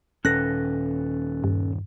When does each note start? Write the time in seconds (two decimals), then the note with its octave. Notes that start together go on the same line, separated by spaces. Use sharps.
0.25 D#1 C#4 A4 B4 F#6 A#6
1.44 G2